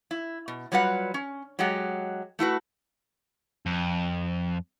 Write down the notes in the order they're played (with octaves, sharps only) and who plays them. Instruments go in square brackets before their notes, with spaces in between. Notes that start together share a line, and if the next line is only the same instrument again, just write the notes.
[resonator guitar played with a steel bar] E4
B2
F#3 G3 F4 B4 F#5
C#4
F#3 G#3 G4 G#4 F#5
A3 E4 F#4 B4
[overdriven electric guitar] F2